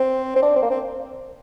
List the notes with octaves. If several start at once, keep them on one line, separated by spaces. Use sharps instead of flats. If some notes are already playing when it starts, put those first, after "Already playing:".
Already playing: C4
C4
D4
C4
A#3
C4